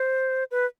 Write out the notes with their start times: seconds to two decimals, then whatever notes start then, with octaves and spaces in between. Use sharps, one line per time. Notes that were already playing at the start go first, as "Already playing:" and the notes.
Already playing: C5
0.51 B4